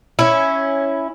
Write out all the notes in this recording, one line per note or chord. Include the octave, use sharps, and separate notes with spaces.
C#4 E4